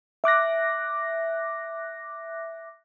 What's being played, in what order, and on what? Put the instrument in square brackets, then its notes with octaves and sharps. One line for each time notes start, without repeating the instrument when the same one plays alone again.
[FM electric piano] E5 D6 F#6 A#6